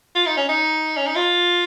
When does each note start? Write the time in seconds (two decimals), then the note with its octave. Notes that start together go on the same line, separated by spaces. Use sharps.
0.15 F4
0.27 D#4
0.37 C#4
0.49 D#4
0.97 C#4
1.07 D#4
1.16 F4